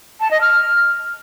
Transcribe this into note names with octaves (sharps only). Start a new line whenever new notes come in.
A5
D#5
F6